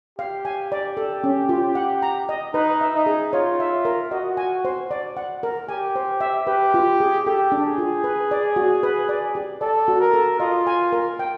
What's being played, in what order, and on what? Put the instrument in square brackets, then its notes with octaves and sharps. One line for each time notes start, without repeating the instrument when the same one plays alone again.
[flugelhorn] G4 [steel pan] F5
[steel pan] G#5
D5
A4
C#4
F4
F#5
A#5
D#5
[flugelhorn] D#4 [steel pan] B4
[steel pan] E5
[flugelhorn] D#4
[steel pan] G#4
[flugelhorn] F4 [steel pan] C#5
[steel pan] E5
A#4
[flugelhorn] F#4 [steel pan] D#5
[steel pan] G#5
C5
D5
F#5
A#4
[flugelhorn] G4 [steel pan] G#5
[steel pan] C5
E5
[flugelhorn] G4 [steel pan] B4
[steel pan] F4
G#4
[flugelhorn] G4 [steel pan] A4
[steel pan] D4
[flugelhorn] G#4
[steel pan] F4
B4
D5
F#4
B4
D5
G4
[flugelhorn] A4 [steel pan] D5
[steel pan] F#4
[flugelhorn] A#4
[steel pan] A4
[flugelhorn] F4 [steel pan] D#5
[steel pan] G#5
A#4
G5